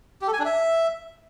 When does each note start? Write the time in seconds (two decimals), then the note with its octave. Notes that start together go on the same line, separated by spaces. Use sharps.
0.21 G4
0.27 A4
0.33 G#5
0.39 D4
0.45 E5